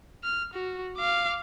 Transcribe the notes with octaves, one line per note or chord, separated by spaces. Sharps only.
F6
F#4
F5 D6